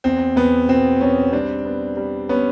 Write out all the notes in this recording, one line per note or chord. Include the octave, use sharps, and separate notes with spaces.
E2 C4
E2 B3
B2 C4
E2 B3 C#4
G3 C4 D4
B3
G3
B3 C#4